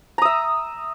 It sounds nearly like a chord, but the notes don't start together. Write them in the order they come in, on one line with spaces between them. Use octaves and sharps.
A#5 D#6 E5